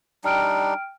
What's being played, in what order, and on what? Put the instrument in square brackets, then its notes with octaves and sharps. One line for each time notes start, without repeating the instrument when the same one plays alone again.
[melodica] G3 D4 D#4 [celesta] G5 F6 D7